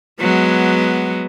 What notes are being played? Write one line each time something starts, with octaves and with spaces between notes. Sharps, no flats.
F#3 G#3 B3